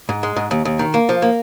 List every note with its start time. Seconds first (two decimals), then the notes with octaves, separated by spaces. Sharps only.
0.09 G#2
0.23 G#3
0.36 G#2
0.51 D#2
0.65 D#2
0.79 D#3
0.94 A#3
1.09 F3
1.22 A#3